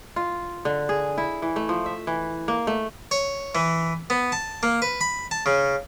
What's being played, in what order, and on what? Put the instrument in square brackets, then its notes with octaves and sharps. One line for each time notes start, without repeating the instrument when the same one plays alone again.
[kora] F4
D3
G#4
E4
E3
A3
F3
E5
E3
A#3
A3
[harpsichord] C#5
E3
B3
A5
A#3
B4
B5
A5
C#3